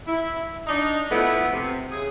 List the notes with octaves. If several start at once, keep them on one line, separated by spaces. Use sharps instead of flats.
E4
D4 D#4
F3 A3 B3 E4
C3
C#3 G#4